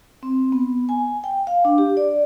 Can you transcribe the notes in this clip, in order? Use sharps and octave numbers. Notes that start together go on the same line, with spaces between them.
C4
B3
G#5
G5
F5
D4
G4
D5